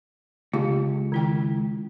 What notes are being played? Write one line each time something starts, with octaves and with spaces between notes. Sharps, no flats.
C#2 G4
D#3 E4 G5